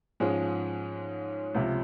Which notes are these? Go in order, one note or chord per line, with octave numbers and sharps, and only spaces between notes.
G#2 F3 G#3 C#4
C#2 C3 F3